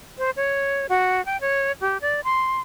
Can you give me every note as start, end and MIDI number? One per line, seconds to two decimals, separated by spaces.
0.18 0.31 72
0.36 0.86 73
0.89 1.24 66
1.26 1.40 79
1.41 1.72 73
1.81 1.98 67
2.01 2.21 74
2.24 2.61 84